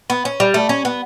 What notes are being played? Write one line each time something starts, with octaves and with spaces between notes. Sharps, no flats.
B3
C#4
G3
A3
C#4
B3